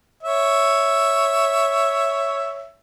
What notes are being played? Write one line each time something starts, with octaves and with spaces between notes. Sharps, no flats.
C#5 E5